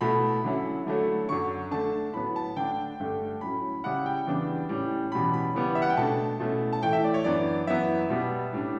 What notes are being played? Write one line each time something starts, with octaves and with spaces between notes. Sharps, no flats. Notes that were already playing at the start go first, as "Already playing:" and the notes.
B2 A3 E4 B5
D3 F#3 C#4 E4
D3 F#3 A3 E4
F#2 D3 F#3 C#6
D3 A3 D4 A5
A2 F#3 B3 B5
A5
D3 A3 D4 G5
G2 D3 A3 D4
A2 F#3 C#4 B5
C#3 G3 C#4 E4 F#5
G5
E2 C#3 G3 B3 D4
A2 G3 C#4
E2 B2 G3 C#4 B5
B5
C#3 E3 G3 B3
E5
F#5
G5
B2 A3 D4 A5
B2 A3 C#4 E4
A5
A2 E3 A3 G5
E5
D5
C#5
F#2 E3 B3 D4 D5
F#2 E3 B3 E4 E5
B2 G3 B3
A2 G3 D4